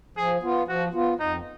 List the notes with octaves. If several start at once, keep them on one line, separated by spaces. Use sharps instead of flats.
F3 G#4
B3 F4
F3 F#4
B3 F4
F2 D#4